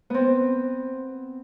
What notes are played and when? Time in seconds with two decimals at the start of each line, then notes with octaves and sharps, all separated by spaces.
0.10 B3 C4